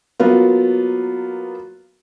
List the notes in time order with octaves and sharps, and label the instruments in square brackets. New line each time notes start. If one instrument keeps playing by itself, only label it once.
[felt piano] F#3 A#3 B3 F4